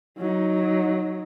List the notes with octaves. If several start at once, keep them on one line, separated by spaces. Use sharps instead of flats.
F#3 D#4